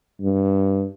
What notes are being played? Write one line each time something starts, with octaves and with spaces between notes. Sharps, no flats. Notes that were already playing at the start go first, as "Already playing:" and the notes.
G2